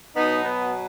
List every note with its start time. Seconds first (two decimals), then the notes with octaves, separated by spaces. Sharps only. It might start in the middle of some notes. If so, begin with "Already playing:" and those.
0.15 B2 F#3 B3 D#4
0.45 B3